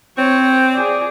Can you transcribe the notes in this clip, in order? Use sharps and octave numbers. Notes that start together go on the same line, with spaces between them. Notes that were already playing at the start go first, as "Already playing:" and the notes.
C4 C#5
G#4 D5